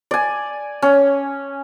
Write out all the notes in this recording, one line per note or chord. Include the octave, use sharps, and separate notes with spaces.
D5 G#5
C#4